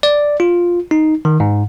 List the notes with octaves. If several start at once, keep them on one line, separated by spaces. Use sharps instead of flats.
D5
F4
D#4
D#3
G#2